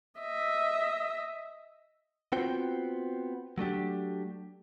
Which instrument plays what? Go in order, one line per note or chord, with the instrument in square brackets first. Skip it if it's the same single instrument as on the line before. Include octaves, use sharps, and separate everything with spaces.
[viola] D#5 E5
[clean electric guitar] B3 C4 F4 F#4 C5 G5
F#3 A3 D4 G4